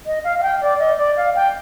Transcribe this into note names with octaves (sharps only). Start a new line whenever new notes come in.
D#5
F5
F5
G5
D5
D#5
D5
F5
G5